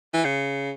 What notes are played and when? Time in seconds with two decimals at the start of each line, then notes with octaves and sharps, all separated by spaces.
0.13 E3
0.24 C#3